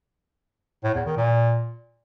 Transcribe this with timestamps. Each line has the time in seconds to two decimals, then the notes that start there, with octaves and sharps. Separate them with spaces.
0.84 A2
0.95 E2
1.06 D#3
1.17 A#2